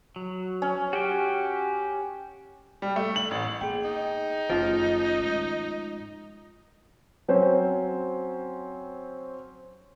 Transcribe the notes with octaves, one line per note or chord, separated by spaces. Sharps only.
F#3
C#4
F#4 G4 G5
G3
A3
F#7
A1
A#3 B3 G#4 G5
D#4
F#1 D#3 F3 A3 C#4 D7
G#2
F#3 C4 C#4 C5